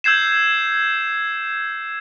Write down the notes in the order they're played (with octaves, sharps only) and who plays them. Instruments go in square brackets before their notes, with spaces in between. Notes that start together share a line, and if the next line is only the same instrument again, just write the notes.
[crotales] E6 G6 G#6 C7 E7